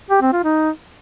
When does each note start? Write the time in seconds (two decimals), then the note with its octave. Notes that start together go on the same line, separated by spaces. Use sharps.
0.11 G4
0.22 C4
0.33 F4
0.44 D#4